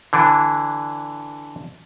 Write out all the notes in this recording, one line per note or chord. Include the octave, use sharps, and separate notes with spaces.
D3 E3 D4